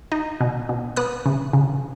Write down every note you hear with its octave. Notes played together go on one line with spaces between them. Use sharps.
D#4
B2
B2
B3 D#6 F#6
C#3
C#3